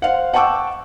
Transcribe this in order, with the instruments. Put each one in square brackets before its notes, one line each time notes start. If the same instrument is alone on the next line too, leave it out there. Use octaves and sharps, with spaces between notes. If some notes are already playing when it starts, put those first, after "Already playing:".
[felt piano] C5 F5 F#5
F#5 G5 A5 C#6 D6 E6